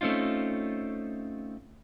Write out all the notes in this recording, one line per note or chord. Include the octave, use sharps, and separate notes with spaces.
A3 C4 C#4 D#4 F4